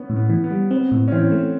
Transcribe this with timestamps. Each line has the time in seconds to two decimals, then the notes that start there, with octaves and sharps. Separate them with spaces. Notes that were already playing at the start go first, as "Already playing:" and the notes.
Already playing: B3 C#4
0.09 A2
0.16 B3
0.30 E3
0.44 B3
0.51 G3
0.71 B3 C4
0.91 A2
1.08 C#4
1.12 E3 C4
1.32 A3